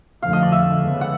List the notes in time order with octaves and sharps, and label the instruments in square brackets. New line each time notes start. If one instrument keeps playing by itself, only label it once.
[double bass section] F2 D3 F3 A3 [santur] F5
[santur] D#5
D5
E5
[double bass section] C#3 F3 G#3 B3
[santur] F#5